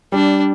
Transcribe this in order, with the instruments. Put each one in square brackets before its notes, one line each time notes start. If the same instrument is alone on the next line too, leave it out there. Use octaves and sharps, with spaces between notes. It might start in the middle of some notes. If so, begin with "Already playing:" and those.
[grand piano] G3 [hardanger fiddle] D4